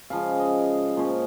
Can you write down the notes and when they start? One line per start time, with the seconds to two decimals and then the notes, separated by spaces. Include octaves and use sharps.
0.10 C#3 F3 G#3 F5
0.39 D#5
0.97 A#2 F3 G#3 C#4 C5